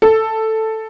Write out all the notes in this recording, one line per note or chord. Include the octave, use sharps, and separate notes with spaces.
A4